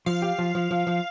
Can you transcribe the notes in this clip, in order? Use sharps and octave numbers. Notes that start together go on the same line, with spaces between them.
F3 F5
G4
F3
F3
F3
F3